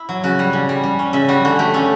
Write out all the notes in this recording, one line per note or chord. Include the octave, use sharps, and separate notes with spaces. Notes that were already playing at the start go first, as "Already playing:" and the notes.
Already playing: E4
F#3
C#3 F#4
G3
C#3
G3
G3
C#4
C#3 E5
G3 F#4
D3 F#4
A3 G4
C#4 A4